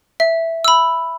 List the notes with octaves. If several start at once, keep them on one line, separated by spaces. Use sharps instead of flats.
E5
B5 E6